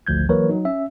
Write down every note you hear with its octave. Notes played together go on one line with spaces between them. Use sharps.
G#1 D2 F3 G6 G#6
E3 F#3 A#3 A#4 B4 C#5
F#3 D#4
C#4 E5